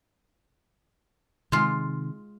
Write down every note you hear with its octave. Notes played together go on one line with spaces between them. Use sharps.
C3 D#3 G#3 F4